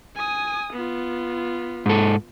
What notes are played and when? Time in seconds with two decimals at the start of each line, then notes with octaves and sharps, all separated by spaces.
0.16 G#5 D#6
0.73 B3 F4
1.86 G#2 A4